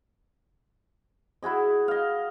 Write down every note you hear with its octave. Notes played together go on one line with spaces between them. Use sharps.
E4 F#4 G#4 D#5
D#5 F5